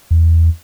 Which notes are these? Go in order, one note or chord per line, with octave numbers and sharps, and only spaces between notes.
E2